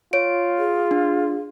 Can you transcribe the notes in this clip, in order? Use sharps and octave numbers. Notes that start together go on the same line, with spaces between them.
F4 C#5 D7
G#4
D4